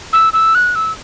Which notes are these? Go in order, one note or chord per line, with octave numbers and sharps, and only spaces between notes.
E6
E6
F#6
E6